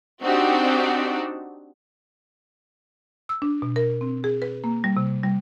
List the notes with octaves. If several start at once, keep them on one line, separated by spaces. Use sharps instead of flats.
C4 D4 D#4 F#4 G4
E6
D4
B2
A#4
C4
G#4
B4
A#3
G3
C3
G3